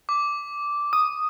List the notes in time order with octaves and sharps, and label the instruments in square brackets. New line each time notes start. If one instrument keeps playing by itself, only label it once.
[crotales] D6
[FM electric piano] D#6